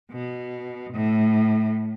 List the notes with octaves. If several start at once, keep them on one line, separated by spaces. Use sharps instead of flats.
B2
A2